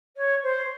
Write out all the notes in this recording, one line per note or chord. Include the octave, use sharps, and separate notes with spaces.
C#5
C5